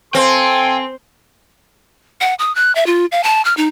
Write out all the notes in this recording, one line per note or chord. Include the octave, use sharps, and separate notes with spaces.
C4 A4 F5 G5 G#5 C6
F#5
D#6
F#6
E5
F4
F5
A5
F6
D#4